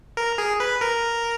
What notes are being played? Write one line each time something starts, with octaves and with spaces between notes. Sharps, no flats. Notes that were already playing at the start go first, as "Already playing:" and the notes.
A#4
G#4
B4
A#4